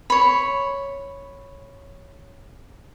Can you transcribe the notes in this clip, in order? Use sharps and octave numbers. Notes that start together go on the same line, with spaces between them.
C#5 B5